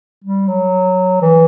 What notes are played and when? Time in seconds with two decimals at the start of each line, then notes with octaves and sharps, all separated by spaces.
0.24 G3
0.48 F#3
1.22 E3